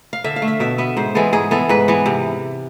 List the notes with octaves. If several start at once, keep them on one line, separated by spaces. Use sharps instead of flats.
F5
D3 E5
F5
A3
E5
B2 E5
B3 E5
G#2 C5
E3 G#3 B3 A4
G#2 G#4
E3 B3 A4
G#2 B4
E3 B3
C3